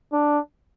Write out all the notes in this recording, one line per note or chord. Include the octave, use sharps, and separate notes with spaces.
D4